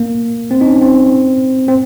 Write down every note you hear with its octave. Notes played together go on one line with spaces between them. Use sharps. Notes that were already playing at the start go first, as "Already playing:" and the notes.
Already playing: A#3
C4
D#4
C#4
C4
C4